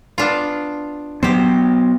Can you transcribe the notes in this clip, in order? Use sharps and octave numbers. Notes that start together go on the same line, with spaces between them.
B3 D4 F4
F#3 B3 G4 C5